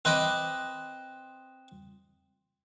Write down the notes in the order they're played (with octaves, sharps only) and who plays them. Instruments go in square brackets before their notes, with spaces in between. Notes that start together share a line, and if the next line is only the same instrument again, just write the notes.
[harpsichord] C4 B4 D#5 D6 D#6